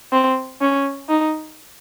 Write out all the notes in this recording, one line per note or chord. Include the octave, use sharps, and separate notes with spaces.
C4
C#4
D#4